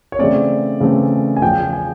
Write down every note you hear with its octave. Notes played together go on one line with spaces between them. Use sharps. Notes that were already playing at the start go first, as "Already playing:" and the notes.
C#5
C#3 E3 A3 C4 D5
C#3 E3 A3 C4
G#5
E2 C#3 F3 G5
G#5